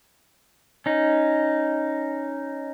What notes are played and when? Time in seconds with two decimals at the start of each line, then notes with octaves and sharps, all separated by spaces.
0.86 C#4 D#4